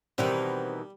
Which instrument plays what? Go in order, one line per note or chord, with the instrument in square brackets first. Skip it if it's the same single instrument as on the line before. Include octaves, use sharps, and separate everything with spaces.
[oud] B2 D#3 E3 [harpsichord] G3 [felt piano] C4